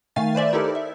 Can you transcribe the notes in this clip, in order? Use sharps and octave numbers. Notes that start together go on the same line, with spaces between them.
D#3 A3 F5 G#5 A6
B4 C5 D5 E5
D#4 E4 G4 A4 A#4
E5